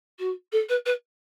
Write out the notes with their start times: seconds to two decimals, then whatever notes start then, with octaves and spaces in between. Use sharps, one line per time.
0.19 F#4
0.52 A4
0.69 B4
0.85 B4